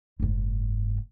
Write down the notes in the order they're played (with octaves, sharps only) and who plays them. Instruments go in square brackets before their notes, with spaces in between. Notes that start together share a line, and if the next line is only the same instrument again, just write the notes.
[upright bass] F#1 G#2